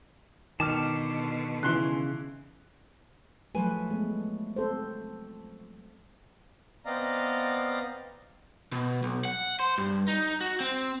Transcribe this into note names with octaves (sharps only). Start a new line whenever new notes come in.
B2 D3 D#3 A5 D6 F6
C#3 E3 C6 F#6
F3 F#3 A3 B4 G#5
G#3 A3 B3
C4 A4 C5
B3 C4 D5 D#5 F5 A#5
B2
B1
F#5
C5
G2
D#4
F#4
C4